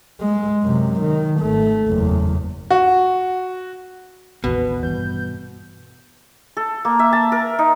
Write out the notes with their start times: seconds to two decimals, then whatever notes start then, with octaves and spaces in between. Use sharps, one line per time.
0.21 G#3
0.63 F#2 C3
1.01 D#3
1.40 G#1 A3
1.87 F#1 E2
2.71 F#4
4.44 A1 D#2 B2 B4
4.83 G2 E3 G6
6.57 A4
6.85 A#3
6.99 E5
7.13 A5
7.32 A#4
7.59 D#4